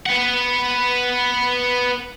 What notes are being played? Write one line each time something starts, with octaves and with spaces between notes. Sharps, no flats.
B4 F#5